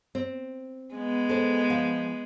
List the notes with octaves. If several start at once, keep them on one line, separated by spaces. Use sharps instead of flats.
C4
G#3 B3
A4 C5
F3